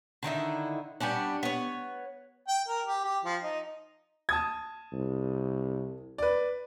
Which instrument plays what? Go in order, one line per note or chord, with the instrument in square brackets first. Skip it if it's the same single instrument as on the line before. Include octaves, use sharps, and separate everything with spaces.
[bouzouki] D3 D#3 D#4 E4
G3 B3 C#4 D4
B3 C#5
[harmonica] G5
A#4
G4
G4
F3
D#4
[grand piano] A5 D#6 G#6
[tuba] C2
[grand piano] B4 D5